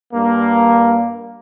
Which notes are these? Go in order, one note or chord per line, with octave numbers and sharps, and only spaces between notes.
G2 A#3